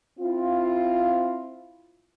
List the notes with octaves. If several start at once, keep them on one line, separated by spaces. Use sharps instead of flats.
C4 E4 F4